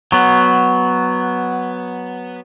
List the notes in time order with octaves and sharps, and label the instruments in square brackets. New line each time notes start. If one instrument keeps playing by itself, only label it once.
[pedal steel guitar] F#3 B3